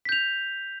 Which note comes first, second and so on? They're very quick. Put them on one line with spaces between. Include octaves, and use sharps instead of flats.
B6 G6 F7